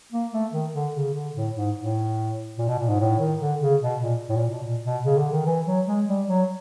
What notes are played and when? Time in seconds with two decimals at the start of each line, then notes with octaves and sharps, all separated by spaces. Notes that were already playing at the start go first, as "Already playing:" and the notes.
0.12 A#3
0.32 A3
0.52 D#3
0.74 D3
0.95 C#3
1.14 D3
1.36 A2
1.56 G#2
1.77 A2
2.58 A#2
2.68 B2
2.79 A#2
2.89 G#2
3.00 A2
3.19 D#3
3.40 D3
3.61 C#3
3.82 B2
4.02 A#2
4.29 A2
4.37 A#2
4.50 B2
4.64 A#2
4.84 B2
5.05 C#3
5.18 D3
5.32 D#3
5.46 E3
5.66 F#3
5.86 G#3
6.08 G3
6.28 F#3